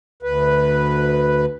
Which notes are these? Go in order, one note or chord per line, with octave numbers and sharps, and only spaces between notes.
D2 B4